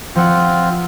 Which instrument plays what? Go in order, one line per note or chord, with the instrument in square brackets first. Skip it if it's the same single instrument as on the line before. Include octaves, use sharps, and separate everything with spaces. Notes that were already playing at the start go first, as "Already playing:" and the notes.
[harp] F3 F#5 [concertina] C4 F4